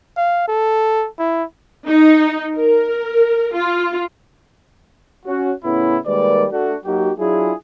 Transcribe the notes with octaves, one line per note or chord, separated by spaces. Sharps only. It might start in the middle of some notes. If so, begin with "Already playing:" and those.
F5
A4
E4
D#4
A#4
F4
C#4 F#4
A2 C#3 B3 C#4 E4
D#3 G3 G#3 A#3 B4 D5
A3 D4 F#4
F#3 A#3 D#4 F#4 G4
F#3 D4 E4 F4 G#4